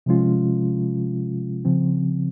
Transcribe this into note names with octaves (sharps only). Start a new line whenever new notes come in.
C3 F3 G#3 C#4 F4
C#3 F3 C4